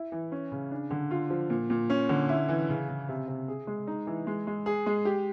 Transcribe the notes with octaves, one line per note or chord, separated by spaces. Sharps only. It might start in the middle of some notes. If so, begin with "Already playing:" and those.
Already playing: E4
E3
C#4
C#3
D4
D3
F4
F3
A#2
A#2
C#4
D3
E4
E3
C#3
C#3
C3
C3
G#4
G#3
D#4
E3
G#3
G#3
G#4
G#3
G4